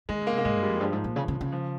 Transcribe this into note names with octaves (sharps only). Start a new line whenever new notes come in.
D#3 G#3
C#3
A#3
C3
A#3
G#2 G#3
G2
G3
F2
G3
G2 F3
G#2
A#2
C#3
C#3
C#3
F3